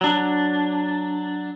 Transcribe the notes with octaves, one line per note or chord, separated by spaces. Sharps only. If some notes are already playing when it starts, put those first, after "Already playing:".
F#3 D4